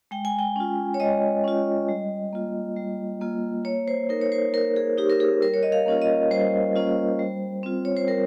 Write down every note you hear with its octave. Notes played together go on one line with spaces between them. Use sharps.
G#3 G5
G#5
G5
C#4 F4
C#5
G#3 D#5
C#4 F4
G3
A#3 F4
G3
A#3 F4
A#3 C#5
C5
D#4 A#4
C#5
C5
A#3 A#4
G#4
D#4 G4
A#4
G#4
G3 A#4
C#5
D#5
F5
A#3 C#4 F4
D#5
G3 C5
A#3 C#4 F4
G3
C4 F4
C#5
C5
G3 A#4